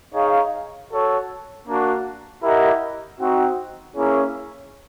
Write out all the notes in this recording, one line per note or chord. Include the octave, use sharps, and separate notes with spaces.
D#4 G#4 C#5 F5
F#4 A4 C#5
A#3 D4 F#4
E4 G4 A#4 D#5 F#5
C4 D#4 F#4
A#3 C#4 E4 G#4 C#5